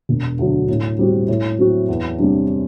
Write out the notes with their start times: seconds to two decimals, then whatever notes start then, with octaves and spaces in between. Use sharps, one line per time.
0.09 E1
0.39 D2 D3 F#3
0.68 A2
0.99 G3 C4 F#4
1.28 A2
1.59 F#3 C4 F#4
1.88 E2
2.19 C3 G3 D4